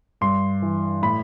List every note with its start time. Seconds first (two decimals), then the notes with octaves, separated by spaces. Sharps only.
0.21 G2 C6
0.62 E3
1.02 A2 B5